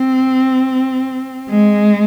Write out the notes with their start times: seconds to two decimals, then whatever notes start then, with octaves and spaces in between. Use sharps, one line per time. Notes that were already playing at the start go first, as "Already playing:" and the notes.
Already playing: C4
1.49 G#3